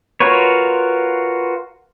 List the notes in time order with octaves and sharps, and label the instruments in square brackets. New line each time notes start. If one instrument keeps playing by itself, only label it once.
[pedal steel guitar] F4 F#4 A#4 B4 C#5